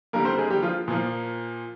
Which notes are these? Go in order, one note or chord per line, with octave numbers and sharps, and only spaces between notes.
D3 G3 A#3 A#4
C4 C5
G#3 G#4
G3 G4
F3 F4
A#2 F3 A#3